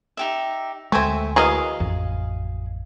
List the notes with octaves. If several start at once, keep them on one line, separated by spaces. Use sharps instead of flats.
D#4 G4 E5
D2 G#3 A3 C4 E5 G#5 C#6
E3 F#3 G#4 A#4 D#5 F5
A1 F2